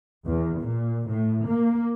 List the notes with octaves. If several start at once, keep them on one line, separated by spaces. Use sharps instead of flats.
E2
A#2
A2
A#3